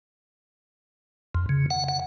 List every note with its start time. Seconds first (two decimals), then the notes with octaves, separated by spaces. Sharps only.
1.35 F2
1.49 C#3
1.70 F#5
1.89 F#5